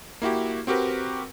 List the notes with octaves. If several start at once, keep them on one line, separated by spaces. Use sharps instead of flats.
A#3 E4 F#4 G4
C4 F#4 G4 A#4 B4